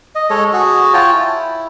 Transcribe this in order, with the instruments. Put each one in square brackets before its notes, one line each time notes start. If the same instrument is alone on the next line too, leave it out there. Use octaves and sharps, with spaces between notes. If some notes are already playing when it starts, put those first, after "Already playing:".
[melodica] D#5
G#3 A4 C#5
F#4 G#4
F4 C#5 G5 A5
E4